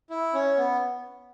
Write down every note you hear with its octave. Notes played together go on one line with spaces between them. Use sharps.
E4
C#4
B3